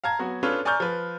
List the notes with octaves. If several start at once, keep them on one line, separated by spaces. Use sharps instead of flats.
F5 A5 A#5 G#6
F#3 B3 F#4
C#4 D4 F4 A4 B4 C#5
D5 G#5 A#5 C#6 F6 G6
F3 B4